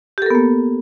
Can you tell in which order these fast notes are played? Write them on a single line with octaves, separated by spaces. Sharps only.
G4 A4 A#4 B3 A#3